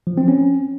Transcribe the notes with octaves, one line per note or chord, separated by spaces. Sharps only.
F3
C4
C#4